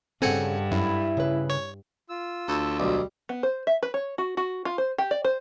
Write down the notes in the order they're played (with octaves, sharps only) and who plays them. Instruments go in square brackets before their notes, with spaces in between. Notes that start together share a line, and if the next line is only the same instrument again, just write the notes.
[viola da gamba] G2 [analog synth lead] C#3 [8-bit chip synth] C4 G#5 C#7 [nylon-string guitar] A4 F#5
[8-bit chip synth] F#2 [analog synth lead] E4
[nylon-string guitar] C#3 B4
[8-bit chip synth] C#5
[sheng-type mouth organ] F4 E6
[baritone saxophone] D2 [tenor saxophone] A4
[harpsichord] B1 [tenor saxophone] G3
[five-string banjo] B3
C5
E5
B4
C#5
F#4
F#4
F4
C5
G4
D5
C5